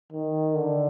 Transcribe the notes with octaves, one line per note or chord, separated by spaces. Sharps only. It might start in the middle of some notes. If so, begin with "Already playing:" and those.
D#3
D3